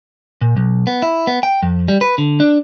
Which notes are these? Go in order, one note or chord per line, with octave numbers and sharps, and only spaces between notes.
A#2
B1
B3
E4
B3
G5
F2
G3
B4
D3
D4